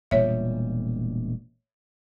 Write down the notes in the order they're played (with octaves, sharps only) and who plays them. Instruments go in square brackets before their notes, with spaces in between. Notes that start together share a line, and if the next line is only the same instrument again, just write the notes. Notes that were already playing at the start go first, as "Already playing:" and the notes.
[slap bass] E1 A#2 G3 [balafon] C#5 E5